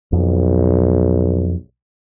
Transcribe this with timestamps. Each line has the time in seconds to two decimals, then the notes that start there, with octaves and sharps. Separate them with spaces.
0.13 B1 F2